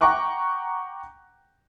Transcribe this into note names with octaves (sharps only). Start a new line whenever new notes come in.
F#5 G5 A#5 C#6 D6 F#6